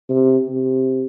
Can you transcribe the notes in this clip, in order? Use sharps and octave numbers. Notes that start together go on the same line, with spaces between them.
C3
C3